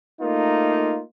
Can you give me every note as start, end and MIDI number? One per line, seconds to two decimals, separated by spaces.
0.21 1.02 57
0.21 1.02 58
0.21 1.02 63
0.21 1.02 65